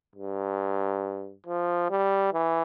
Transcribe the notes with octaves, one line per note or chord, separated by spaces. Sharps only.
G2
F3
G3
E3